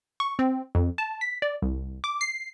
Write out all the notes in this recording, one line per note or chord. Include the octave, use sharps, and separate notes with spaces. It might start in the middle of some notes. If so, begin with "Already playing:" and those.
C#6
C4
F2
A5
B6
D5
C2
D6
C7